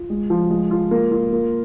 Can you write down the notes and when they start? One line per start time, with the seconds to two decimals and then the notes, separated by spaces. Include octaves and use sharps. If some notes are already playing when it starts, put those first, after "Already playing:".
Already playing: F4
0.10 G#3
0.30 F3
0.50 G#3
0.71 F4
0.91 A#3
1.12 F4
1.32 A#3